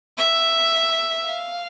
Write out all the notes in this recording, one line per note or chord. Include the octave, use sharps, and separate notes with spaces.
E5
F5